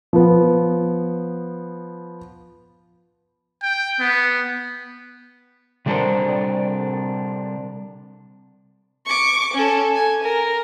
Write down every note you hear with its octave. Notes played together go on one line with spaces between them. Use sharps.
F3 B3
G5
B3
C3 G3 D4 A4 A#4 C5
C#6 D6
C#4 A4
G#5
A#4